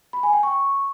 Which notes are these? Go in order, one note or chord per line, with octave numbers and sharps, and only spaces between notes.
B5
G#5
G5
C#6